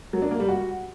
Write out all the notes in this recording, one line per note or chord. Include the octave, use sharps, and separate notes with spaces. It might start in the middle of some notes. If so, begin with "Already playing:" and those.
F#3
D4
A#3
G3
F#4